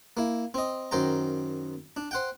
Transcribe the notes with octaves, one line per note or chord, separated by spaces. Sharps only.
A#3 E4
C4 D#5
F#2 D#3 C5 G5 A#5
D4
C5 F#5 G5